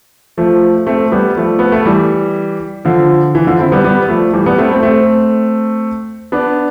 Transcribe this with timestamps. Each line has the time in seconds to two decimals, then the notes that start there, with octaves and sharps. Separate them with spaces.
0.38 F3 A3
0.87 A3 C4
1.12 G3 B3
1.37 F3 A3
1.59 B3
1.72 A3
1.86 E3 G3
2.85 D3 F3
3.35 E3
3.47 D3 F3
3.59 C4 E4
3.72 G3 B3
3.84 G3 B3
4.08 F3 A3
4.33 E3 G3
4.46 G3 B3
4.58 A3 C4
4.71 A3 C4
4.83 A3 C4
6.32 B3 D4